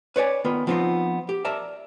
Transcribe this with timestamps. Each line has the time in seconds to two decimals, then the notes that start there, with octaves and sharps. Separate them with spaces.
0.16 B4 C#5 D5 G#5
0.45 D#3 B3 F4
0.67 F3 B3 C4 D4 D#4 F4
1.29 G4
1.45 A#4 D5 E5 A5 A#5